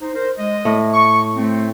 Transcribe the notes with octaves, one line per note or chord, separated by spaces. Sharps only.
D#4 C5
A#4 C5
G#3 D#5
A2
C#6
A3 C4